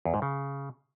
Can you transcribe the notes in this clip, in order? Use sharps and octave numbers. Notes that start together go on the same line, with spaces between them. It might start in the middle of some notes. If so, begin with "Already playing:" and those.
E2
G#2
C#3